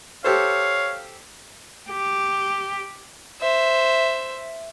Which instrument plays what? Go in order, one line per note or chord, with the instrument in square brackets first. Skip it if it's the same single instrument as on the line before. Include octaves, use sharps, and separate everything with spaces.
[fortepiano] G4 A4 C5 [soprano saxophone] C#5 [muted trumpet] F5
[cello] G4
[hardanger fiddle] C5 E5